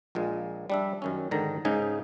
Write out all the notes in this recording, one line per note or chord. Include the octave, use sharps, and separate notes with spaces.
A#1 A#2 G#3
G3 D4 E5
F#2 D#3 C#4
G#2 D3 D#3 A#5
G#2 C#3 D#4 G#5